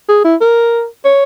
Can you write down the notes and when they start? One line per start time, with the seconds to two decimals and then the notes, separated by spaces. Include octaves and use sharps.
0.09 G#4
0.24 E4
0.41 A#4
1.05 C#5